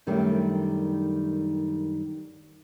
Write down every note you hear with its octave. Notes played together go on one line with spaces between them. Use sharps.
F#2 D#3 G3 A3 D4